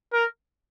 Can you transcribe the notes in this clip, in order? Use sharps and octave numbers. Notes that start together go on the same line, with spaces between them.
A#4